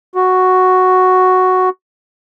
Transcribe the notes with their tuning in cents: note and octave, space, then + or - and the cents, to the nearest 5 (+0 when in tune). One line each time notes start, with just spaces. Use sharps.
F#4 +0